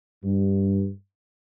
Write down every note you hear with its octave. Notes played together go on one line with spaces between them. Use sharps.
G2